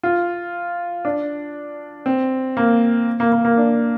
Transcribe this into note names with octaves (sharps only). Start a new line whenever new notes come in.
F4
D4
C4
A#3
A#3
A#3
A#3
D4